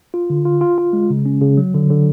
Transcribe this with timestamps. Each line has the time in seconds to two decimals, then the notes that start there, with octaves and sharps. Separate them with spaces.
0.14 F4
0.30 D3
0.45 F4
0.61 F4
0.78 F4
0.93 G#3
1.10 C#3
1.26 C#4
1.41 C#3
1.57 F#3
1.74 D3
1.90 D3